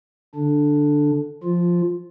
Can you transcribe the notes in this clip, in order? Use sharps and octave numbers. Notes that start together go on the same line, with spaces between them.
D3 D4
F3 F4